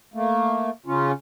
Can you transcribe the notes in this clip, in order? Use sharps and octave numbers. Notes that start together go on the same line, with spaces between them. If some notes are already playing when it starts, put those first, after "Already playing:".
A3 A#3
C#3 C#4 F4